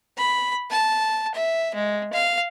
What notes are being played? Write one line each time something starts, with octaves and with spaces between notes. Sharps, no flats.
B5
A5
E5
G#3
F5